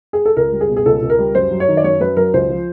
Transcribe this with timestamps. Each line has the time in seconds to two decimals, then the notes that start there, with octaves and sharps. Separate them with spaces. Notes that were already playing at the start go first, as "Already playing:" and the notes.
0.13 G#4
0.25 A4
0.36 C#2 A#4
0.52 G3
0.61 G#4
0.69 B2
0.76 G#4
0.86 C#2 A4
1.02 C#2
1.10 A#4
1.19 G3
1.35 F#2 C5
1.51 F#3
1.60 C#5
1.68 D#3
1.77 D5
1.84 F#2 C#5
2.00 F#2 B4
2.17 F#3 A#4
2.34 C#2 C5
2.49 F3